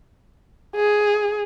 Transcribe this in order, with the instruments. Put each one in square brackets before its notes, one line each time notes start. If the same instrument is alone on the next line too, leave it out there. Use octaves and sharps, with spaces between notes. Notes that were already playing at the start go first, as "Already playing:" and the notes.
[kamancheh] G#4